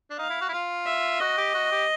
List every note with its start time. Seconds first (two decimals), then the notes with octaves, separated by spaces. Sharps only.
0.10 D4
0.18 D#4 F5
0.30 E4
0.41 F#4
0.49 E4
0.53 F4
0.86 E5
1.20 F#4 D#5
1.38 G4
1.54 F#4
1.72 G4